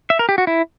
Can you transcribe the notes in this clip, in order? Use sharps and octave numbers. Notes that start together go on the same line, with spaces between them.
E5
A#4
G4
F#4
E4